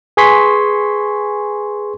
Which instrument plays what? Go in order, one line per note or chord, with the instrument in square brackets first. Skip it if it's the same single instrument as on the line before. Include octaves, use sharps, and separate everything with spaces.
[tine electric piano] G#4 B4 G#5 C6 C#6 B6